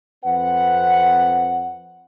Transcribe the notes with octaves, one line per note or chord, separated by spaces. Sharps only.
F2 C4 B4 F#5